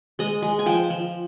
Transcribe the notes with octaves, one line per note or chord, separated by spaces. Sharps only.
G#3 D#5
G#3
G#5
F3 G5
F3